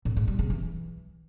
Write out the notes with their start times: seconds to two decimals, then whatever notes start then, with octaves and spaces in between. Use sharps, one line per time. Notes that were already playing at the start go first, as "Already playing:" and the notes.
0.05 A2
0.16 G#2
0.28 G3
0.39 C#3
0.50 E3